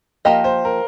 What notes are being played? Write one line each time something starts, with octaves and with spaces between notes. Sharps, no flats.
F3 A#3 G4 D#5 F5
C5
A#4